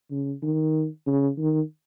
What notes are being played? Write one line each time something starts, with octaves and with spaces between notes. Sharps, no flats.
C#3
D#3
C#3
D#3